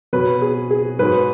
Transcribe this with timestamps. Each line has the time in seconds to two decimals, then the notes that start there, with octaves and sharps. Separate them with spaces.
0.13 B2 F#3 B4
0.42 G#4
0.70 G#4
0.99 G#2 F#3 B4